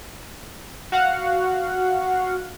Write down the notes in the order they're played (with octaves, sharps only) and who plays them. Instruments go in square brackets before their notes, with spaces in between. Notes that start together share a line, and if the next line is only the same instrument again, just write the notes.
[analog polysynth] F#4 F5 F#5